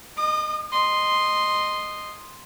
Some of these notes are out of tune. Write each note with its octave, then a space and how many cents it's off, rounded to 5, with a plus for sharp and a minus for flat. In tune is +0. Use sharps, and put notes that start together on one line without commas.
D#5 -15 D#6 -45
D#5 -10 C6 +0